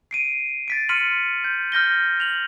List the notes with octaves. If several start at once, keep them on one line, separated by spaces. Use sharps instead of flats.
C7 D7 D#7
A6 B6 D7
C6 F6 B6 C#7 D#7 F#7
G6
F6 G6 A#6 G7
F7 F#7